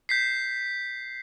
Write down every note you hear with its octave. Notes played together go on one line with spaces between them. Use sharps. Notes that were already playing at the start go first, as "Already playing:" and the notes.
G6 B6 C7